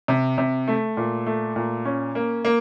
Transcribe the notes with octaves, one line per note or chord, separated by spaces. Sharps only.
C3
C3
A3
A#2
A3
A#2
C#4
A#3
A#3